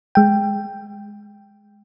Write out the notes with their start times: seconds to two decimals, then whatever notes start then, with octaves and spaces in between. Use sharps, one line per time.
0.15 G#3 G5